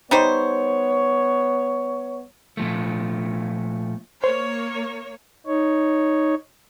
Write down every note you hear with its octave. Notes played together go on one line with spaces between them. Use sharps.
G3 B3 D#4 C5 C#5
A#2 F3 A3
A#3 C5 C#5
D#4 C#5